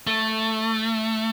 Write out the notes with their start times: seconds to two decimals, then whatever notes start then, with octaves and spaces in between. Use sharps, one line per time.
0.07 A3